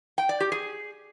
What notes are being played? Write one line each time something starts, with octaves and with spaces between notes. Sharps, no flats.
G5
D5
G4
G#4